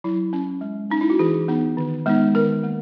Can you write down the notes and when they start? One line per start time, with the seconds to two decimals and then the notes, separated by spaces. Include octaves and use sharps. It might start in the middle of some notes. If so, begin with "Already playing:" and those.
0.04 F#3 E4
0.33 C#4
0.61 G#3
0.90 C#4 D#4
1.01 E4
1.10 F#4
1.19 E3 G#4
1.48 B3 D#4
1.77 D#3
2.06 G#3 B3 D#4
2.34 D#3 A#4
2.63 A#3